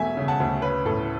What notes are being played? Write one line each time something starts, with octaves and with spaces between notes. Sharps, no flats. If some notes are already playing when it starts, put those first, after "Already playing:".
Already playing: E1 A3 E5 G#5
C#3
F#5 A5
D2
C#4 B4
A2 A4